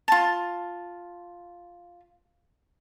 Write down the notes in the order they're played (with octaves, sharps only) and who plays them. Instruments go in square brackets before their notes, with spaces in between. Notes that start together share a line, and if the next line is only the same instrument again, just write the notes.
[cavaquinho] F4 A5